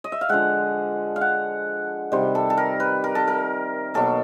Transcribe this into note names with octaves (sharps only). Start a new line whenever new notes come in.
D#5
E5
F5
D3 F3 G#3 F#5
F5
F#5
C3 D#3 G3 C5
A4
A4
A#4
B4
A#4
A4
A#4
B2 F#3 A#3 A4